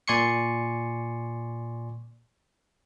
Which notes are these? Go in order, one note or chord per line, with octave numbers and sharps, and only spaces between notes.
A#2 D5 G#5 C6 C#6 C#7